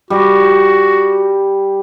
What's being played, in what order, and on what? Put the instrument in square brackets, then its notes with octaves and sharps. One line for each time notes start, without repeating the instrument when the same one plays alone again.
[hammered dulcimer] G3 [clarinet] F#4